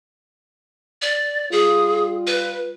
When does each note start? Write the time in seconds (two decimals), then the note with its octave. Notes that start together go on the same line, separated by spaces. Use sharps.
1.02 D5
1.52 G3 F4 G#4
2.27 B4